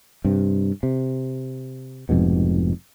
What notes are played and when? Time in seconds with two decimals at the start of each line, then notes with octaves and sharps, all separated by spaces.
0.25 G2 C3
0.83 C3
2.09 F1 F2 G#2 B2